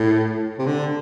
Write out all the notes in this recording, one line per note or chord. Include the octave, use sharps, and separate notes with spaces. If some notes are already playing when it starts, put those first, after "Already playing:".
Already playing: A2
C3
D3